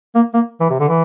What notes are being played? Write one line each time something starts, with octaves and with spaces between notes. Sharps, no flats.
A#3
A#3
E3
C3
D3
E3